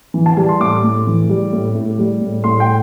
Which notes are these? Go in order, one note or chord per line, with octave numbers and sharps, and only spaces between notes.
E3
A5
G3 A5
C6
A2 D6
A2
E3
G3
A2
A2
G3
A2
A2 C6
G5